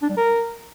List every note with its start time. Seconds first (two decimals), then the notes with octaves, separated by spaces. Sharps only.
0.02 D4
0.09 G3
0.17 A#4